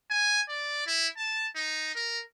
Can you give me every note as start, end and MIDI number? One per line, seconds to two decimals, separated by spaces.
0.11 0.41 80
0.49 0.85 74
0.87 1.07 64
1.17 1.47 81
1.55 1.91 63
1.95 2.21 70